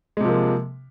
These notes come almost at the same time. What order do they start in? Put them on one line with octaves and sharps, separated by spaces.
G#3 C3 F3 A#3